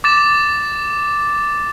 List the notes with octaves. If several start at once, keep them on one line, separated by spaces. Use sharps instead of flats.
D6 A6 E7